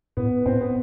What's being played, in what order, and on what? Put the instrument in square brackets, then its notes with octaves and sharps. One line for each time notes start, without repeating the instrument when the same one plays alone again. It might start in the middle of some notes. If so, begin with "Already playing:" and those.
[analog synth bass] A2 [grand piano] B3
[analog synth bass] A2 [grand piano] C4
[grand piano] B3